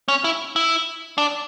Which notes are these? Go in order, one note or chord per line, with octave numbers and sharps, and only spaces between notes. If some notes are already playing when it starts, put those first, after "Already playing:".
C#4
E4
E4
D4